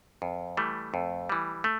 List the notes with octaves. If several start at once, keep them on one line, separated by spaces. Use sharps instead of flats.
F2
E3 G3 A3
F2
E3 G3
A3